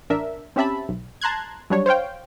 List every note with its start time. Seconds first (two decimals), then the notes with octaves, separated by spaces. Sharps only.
0.10 A1 D4 A#4 E5
0.56 C4 C#4 G4 E5 A5 B5
0.89 B1
1.21 A5 A#5 C6 F#6 G#6
1.70 F#3 G3 D4 C#5
1.86 C5 C#5 F5 G5